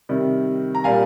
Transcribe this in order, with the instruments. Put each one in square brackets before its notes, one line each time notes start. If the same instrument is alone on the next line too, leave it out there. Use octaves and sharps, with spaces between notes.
[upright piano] C3 D#3 G3
A#5
A#2 G3 A#3 F5 G#5